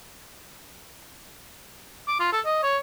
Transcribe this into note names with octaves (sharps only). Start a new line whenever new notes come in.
D6
F4
A4
D#5
C#5